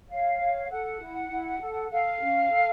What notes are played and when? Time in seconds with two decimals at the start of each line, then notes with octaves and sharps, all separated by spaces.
0.10 C#5 F5
0.40 C#5
0.70 A4 F#5
1.00 E4
1.30 E4
1.60 A4
1.91 A4 F5
2.21 C#4
2.51 A4